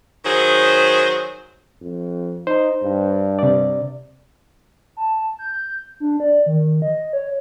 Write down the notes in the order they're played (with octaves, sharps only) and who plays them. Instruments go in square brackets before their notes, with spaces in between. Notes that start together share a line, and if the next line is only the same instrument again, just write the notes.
[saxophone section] D#3 F#3 G#4 C5
[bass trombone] F2
[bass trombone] D#4 [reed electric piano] C5
[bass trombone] G2
[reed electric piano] C3 D5
[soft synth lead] A5
G6
D4
D5
D#3
D#5
C#5